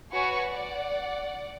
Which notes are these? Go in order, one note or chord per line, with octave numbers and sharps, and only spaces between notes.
F#4 B4 C#5 G#5 C#6
D5 F#5